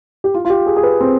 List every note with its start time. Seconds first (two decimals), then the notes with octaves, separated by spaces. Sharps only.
0.24 G4
0.34 F4
0.45 F4
0.50 G4
0.66 G#4
0.76 G#4
0.83 B4
1.01 C4